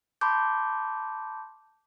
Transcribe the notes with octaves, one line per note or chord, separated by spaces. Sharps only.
A5 B5 C6 D6 G6